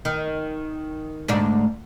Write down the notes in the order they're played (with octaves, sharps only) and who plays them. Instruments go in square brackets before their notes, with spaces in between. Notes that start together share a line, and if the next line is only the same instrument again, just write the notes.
[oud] D#3
D2 G#2 D4